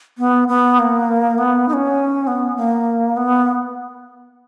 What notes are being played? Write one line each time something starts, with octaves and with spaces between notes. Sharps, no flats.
B3
B3
A#3
B3
D#4
C#4
B3
A#3
B3